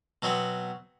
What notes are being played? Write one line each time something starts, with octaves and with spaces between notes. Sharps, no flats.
B2 F#3 B3 C4